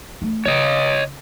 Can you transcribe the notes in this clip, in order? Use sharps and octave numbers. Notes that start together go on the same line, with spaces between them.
A3
C#3 C#5 D#5